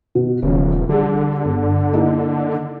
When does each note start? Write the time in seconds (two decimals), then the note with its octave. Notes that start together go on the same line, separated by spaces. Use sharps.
0.15 B2
0.42 D#1 C#3 F3
0.89 D3 G3 G#4
1.45 G1
1.93 A#3 D#4 E4